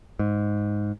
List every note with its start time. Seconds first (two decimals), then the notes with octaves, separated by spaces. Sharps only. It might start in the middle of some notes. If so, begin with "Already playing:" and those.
0.19 G#2